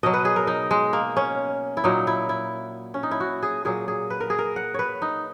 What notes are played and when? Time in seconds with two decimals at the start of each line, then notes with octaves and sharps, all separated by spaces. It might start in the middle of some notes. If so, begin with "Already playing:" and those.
0.03 B2 F#3 D#5
0.13 B4
0.25 G#4
0.36 A#4
0.47 D#4
0.71 G#3
0.93 A#3
1.17 C#4
1.77 E4
1.84 A#2 F#3 D#4
2.07 E4
2.29 E4
2.94 C#4
3.03 D#4
3.11 E4
3.20 F#4
3.42 G#4
3.65 A#2 F#3 G#4
3.88 G#4
4.10 B4
4.20 A#4
4.30 G#4
4.39 A#4
4.56 F#5
4.74 B4 C#5
5.02 D#4